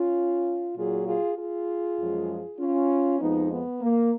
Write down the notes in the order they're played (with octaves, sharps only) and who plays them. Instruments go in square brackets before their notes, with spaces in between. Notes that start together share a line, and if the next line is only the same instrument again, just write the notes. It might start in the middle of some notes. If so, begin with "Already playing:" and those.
Already playing: [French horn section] C#4 F4
A#2 F#3 F4 G#4
F4 G#4
F4 G#4
F#2 F3 G#3
C#4 F4
F2 F3 G#3 B3 D#4
B3
A#3